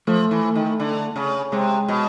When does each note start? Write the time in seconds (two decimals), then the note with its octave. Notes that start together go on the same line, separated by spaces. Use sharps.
0.07 F3 A3
0.31 E3
0.55 D#3
0.80 D3
1.16 C#3
1.52 C3 G#3
1.88 B2